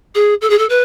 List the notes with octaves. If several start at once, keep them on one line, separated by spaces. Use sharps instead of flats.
G#4
A4
G#4
A4
B4